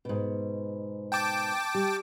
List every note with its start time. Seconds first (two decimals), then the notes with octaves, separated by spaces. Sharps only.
0.05 G#2 B2
1.12 G5 A5 D6
1.75 G3